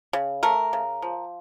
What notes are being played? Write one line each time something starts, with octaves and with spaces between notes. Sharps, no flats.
C#3
A3 A#4
C#3
F3